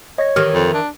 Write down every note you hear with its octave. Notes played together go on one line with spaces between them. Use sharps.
C#5 D#5 A#6
D#3 E3 G4 F6
F2
D4